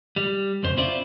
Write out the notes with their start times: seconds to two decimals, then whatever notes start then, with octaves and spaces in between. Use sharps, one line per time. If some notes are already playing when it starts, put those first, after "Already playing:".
0.16 G3
0.63 B1 F2 C#3 C5
0.77 C4 C#4 E4 F4 C5 D5